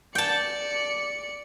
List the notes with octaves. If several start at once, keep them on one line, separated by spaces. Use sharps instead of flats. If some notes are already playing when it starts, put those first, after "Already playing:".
D5 G5 A5 C#7